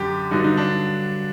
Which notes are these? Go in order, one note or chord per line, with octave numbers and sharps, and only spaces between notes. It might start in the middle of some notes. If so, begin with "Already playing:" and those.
Already playing: F#2 D3 G4
G2 D3 F#3 D#4
D#4
D4